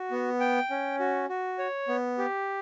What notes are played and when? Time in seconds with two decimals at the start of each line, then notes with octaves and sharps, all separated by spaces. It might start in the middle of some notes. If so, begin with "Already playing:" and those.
Already playing: F#4
0.11 B3
0.40 G5
0.70 C#4
0.99 F#4
1.29 F#4
1.58 C#5
1.88 B3
2.18 G4